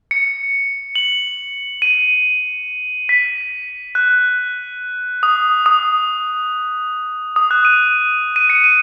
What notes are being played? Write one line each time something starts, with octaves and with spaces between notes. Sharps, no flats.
C#7
F#7
D#7
B6
F#6
D#6
D#6
D#6
F#6
D#7
D#7
C#7
D#7